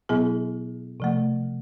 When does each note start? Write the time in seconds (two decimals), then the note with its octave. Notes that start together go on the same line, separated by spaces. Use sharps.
0.09 B2 F#3 B3 E4 G#4
1.00 C3 F3 A3